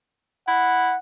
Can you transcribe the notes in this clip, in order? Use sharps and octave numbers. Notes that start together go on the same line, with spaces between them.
E4 F#5